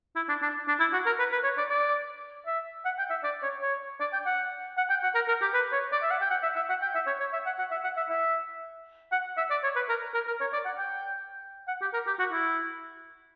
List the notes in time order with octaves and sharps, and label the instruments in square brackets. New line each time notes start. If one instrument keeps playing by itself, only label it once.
[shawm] E4
D4
D4
D4
E4
F#4
A#4
B4
B4
C#5
D5
D5
E5
F#5
G5
E5
D5
C#5
C#5
D5
G5
F#5
F#5
G5
F#5
A#4
A#4
G4
B4
C#5
D5
E5
F#5
G5
F#5
E5
E5
F#5
G5
E5
C#5
C#5
E5
F#5
F#5
E5
F#5
E5
E5
F#5
E5
D5
C#5
B4
A#4
A#4
A#4
C#5
D5
F#5
G5
F#5
G4
A#4
G4
F#4
E4